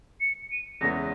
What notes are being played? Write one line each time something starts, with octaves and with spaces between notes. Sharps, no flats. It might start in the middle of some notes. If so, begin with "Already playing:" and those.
C#7
D#7
E2 C#3 E3 G#3 B3 A#6